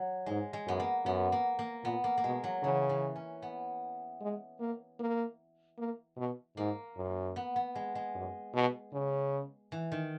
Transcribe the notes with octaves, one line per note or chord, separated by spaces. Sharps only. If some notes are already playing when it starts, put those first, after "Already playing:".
Already playing: F#3
G#2 G#3
G#3
F#2 B3
A#3
F#2 B3
A#3
A#3
A#2 B3
A#3
A#3
B2 G#3
F#3
C#3 E3
E3
C#4
B3
G#3
A#3
A#3
A#3
B2
G#2 A#3
F#2
B3
B3
G#3
G#3
F#2
B2
C#3
E3
D#3